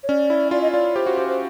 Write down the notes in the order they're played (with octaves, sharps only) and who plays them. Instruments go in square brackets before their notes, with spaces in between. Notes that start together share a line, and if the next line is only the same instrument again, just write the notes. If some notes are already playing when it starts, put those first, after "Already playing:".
[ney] C#5
[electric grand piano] C#4 [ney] D5
[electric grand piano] E4
[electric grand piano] F4 [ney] D5
[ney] D#5
[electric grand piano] F4 [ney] D5
[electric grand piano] G4 [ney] C5
[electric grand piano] F#4
G4
[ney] C5